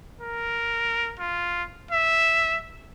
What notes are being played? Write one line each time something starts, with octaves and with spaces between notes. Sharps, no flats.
A#4
F4
E5